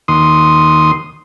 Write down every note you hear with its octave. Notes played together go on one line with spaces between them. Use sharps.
D#2 C6 D#6